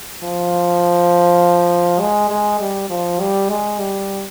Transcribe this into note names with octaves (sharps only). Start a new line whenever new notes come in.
F3
G#3
G#3
G3
F3
G3
G#3
G3